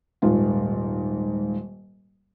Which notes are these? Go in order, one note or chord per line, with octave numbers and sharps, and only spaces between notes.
D#1 G#2 F4